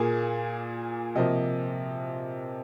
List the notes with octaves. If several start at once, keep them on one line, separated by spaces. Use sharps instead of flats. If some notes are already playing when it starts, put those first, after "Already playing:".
Already playing: A#2 A#3 G#4
C3 F3 A#3 D#5